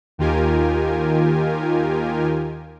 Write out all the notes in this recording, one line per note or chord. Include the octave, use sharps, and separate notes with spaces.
D#2 D#3 F4 G4 A#4 G#5